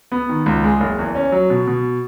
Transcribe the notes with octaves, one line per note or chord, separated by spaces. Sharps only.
B3
D#3
C#2
G#3
F#1
E2
C#4
F#3
B2
B2